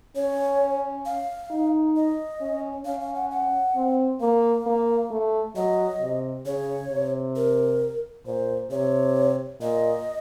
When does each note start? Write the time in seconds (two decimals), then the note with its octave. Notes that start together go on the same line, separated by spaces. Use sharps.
0.16 C#4 C#5
1.06 F5
1.50 D#4
1.96 D#5
2.41 C#4
2.85 C#4 F5
3.01 F5
3.15 F#5
3.31 F#5
3.76 C4
4.20 A#3 F5
4.66 A#3
5.11 A3
5.56 F#3 D#5
6.01 C3
6.46 C#3 C#5
6.90 C3
7.36 A#4
8.26 A#2 C5
8.71 C3 C#5
9.61 A#2 D#5